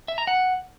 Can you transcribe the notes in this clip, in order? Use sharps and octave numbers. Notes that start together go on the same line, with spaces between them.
E5
A#5
F#5